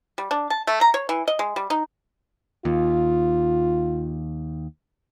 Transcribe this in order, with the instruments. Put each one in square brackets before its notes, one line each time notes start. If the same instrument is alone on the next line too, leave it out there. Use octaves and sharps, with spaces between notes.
[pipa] G3
D4
A5
A3
A#5
C#5
E3
D#5
G#3
G3
D#4
[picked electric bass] D#2 [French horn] F4